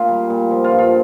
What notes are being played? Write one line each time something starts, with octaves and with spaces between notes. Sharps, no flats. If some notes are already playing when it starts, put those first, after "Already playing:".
Already playing: A#2 F4
G3
A#2
F3
F4
G2
F4